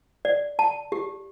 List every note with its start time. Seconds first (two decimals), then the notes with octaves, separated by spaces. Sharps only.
0.25 D5
0.59 A5
0.92 G4